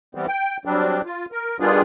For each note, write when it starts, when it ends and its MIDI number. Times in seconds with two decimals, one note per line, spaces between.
0.15 0.26 52
0.15 0.26 55
0.15 0.26 59
0.15 0.26 60
0.28 0.57 79
0.65 1.01 54
0.65 1.01 55
0.65 1.01 60
0.65 1.01 62
1.05 1.26 65
1.32 1.57 70
1.60 1.82 51
1.60 1.82 55
1.60 1.82 59
1.60 1.82 62
1.60 1.82 65
1.60 1.82 68